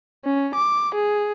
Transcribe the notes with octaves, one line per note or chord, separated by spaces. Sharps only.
C#4
D6
G#4